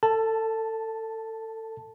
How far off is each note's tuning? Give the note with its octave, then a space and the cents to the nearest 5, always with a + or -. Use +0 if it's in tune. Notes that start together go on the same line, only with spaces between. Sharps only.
A4 +25 A5 +0